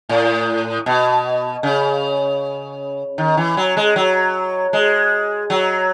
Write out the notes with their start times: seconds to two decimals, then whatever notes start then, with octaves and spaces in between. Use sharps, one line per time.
0.09 A2
0.86 B2
1.63 C#3
3.18 D#3
3.37 E3
3.57 F#3
3.77 G#3
3.96 F#3
4.73 G#3
5.50 F#3